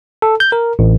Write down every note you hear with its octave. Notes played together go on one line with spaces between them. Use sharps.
A4
G6
A#4
A1